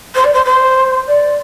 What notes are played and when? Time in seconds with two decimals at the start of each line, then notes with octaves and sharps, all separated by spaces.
0.15 C5
0.24 D5
0.33 C5
0.45 C5
1.07 D5